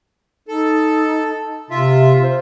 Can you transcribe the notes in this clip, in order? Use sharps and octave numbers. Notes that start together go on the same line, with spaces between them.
D#4 A4
C3 F4 E5
C5